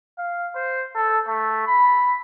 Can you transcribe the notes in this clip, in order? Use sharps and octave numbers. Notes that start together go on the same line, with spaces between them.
F5
C5
A4
A3
B5